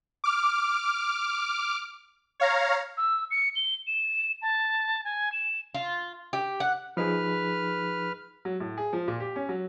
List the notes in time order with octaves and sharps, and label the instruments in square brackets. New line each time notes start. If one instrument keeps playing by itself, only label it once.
[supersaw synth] D6 F6
C#5 F5 A#5
[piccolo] E6
C#7
G7
E7
A5
G#5
E7
[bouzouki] F4
G4
F#5
[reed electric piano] F3 D#4 G#4 [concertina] B4 F6
[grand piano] F#3
A2
G#4
F3
A#2
G4
C#4
F#3